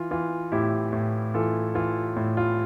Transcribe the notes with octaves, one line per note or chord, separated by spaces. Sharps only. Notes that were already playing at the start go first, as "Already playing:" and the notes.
Already playing: E3 F4
E3 F4
A2 E4 G4
A2
E3 F4 A4
E3 F4
A2
F4